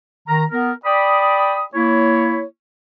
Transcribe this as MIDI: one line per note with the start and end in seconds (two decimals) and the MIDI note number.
0.28 0.44 51
0.28 0.44 82
0.52 0.72 59
0.52 0.72 70
0.85 1.63 74
0.85 1.63 79
0.85 1.63 83
0.85 1.63 87
1.74 2.43 58
1.74 2.43 64
1.74 2.43 73